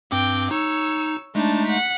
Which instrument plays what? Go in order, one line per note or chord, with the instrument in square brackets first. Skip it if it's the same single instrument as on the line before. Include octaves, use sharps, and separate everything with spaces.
[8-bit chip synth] G2 C4 D6 [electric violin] G5
[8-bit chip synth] D#4 [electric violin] C#5 E6
[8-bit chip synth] G#3 A3 D#4 [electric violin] D4 A5
[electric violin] F#5 B6